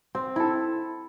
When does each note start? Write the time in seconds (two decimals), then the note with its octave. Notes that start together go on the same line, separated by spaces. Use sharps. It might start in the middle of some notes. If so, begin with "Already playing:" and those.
0.15 C4
0.36 E4 A4